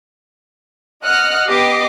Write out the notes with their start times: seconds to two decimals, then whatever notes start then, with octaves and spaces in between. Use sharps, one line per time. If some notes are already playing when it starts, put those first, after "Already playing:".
1.04 D#5 F#5 F6 F#6
1.47 B3 G4 D#5 D6 C7